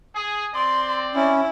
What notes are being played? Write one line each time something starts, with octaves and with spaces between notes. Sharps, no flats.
G#4
C4 D5 C6
C#4 E4